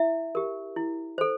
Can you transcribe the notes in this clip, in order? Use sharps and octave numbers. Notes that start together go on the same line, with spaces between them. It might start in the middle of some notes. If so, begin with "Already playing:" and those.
Already playing: E4 E5
G4 A#4
E4
A4 C5